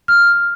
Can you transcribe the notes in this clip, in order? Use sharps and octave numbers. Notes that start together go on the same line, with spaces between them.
F6